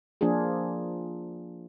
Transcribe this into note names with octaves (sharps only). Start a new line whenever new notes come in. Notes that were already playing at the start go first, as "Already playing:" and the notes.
F3 A#3 D4 F4 G#4